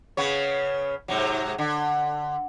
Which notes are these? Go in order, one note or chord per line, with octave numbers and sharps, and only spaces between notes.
C#3 B3 C#5
G#2 C3 F#3
D3